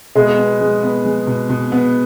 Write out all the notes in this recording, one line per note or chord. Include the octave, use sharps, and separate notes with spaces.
B2 G#3
B3
G#3
B3
G#3
B2
B2
B3